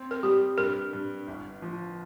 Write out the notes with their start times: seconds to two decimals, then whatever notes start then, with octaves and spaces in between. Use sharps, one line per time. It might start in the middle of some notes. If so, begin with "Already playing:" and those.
Already playing: C4
0.11 A#4
0.23 G3 G4
0.57 G2 A#4
0.93 G2
1.28 G1
1.62 F3